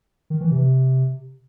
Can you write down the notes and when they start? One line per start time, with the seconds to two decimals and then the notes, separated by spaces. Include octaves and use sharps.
0.30 D#3
0.41 E3
0.51 C3